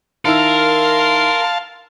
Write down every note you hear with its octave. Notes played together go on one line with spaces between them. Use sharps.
D#3 E4 A#4 F5 A5 C6 E6